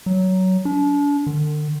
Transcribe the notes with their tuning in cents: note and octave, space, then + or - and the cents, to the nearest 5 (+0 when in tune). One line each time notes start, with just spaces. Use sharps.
F#3 +15
D4 -35
D3 +45